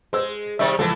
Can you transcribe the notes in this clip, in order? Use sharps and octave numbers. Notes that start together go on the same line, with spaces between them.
G#3 C5 E6
C3 D#3 G3 E5
C#2 E3 F3 A4